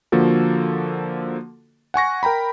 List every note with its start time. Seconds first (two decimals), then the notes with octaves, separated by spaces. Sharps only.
0.12 D3 F3 A#3 F#4 A4
1.94 F#5 G#5 C#6 A#6
2.23 A#4 G5 A#5 B5